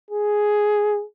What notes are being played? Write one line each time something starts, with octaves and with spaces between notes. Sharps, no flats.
G#4